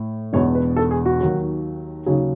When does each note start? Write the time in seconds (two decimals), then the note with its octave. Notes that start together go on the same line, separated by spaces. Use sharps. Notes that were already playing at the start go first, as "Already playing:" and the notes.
Already playing: A2
0.33 E1 E2 B2 C#5
0.55 B4
0.76 A4
0.91 G#4
1.06 F#4
1.20 D#2 D#3 F#3
2.06 D#2 C#3 F#3 G#4